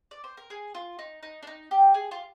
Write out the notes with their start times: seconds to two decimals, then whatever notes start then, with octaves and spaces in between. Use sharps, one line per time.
0.11 D5
0.24 C5
0.37 A#4
0.50 G#4
0.75 F4
0.99 D#4
1.23 D#4
1.43 D4
1.47 D#4
1.71 G4
1.94 G#4
2.11 F4